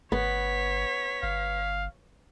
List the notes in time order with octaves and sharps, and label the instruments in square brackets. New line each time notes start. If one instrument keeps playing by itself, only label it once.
[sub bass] G1 [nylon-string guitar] B3 [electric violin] C#5 B6
[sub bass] G1 [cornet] F5